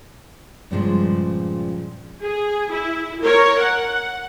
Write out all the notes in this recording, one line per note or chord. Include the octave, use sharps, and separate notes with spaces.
G2 A#2 C#3 F3 G#3 D4
G#4
E4
A#4 C#5
F#5